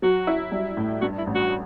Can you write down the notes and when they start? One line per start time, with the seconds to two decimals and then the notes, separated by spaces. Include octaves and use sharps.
0.02 F#3 F#4
0.27 E4
0.51 G3
0.77 A2
1.01 G2 F#4
1.18 E4
1.27 A1
1.35 F#4